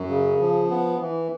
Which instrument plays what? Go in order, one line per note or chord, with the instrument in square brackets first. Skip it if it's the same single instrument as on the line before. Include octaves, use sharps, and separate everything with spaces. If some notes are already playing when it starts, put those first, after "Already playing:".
Already playing: [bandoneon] F#2
C#3
F3
B3
E3